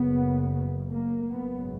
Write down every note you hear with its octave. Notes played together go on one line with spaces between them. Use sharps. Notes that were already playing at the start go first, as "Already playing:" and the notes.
Already playing: F#1 F#2 C#3 B3
A#3
G#1 F#2 C#3 B3